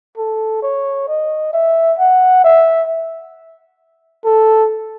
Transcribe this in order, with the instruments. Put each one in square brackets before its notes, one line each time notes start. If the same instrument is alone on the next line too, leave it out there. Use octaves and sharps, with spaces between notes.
[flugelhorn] A4
C#5
D#5
E5
F#5
E5
A4